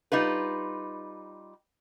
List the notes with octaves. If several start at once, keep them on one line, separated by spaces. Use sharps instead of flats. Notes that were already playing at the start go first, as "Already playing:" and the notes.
G3 D#4 F4 B4